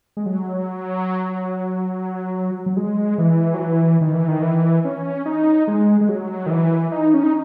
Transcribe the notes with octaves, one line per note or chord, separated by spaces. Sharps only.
G#3
F#3
F#3
G#3
E3
F#3
E3
D#3
E3
D#3
E3
C#4
D#4
G#3
G#3
F#3
D#3
E3
D#4
C#4
D#4